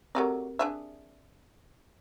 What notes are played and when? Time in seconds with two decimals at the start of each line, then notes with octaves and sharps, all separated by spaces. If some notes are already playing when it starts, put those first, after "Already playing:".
0.15 F#3 A3 C4 G4 A#4 D5
0.59 D4 G#4 E5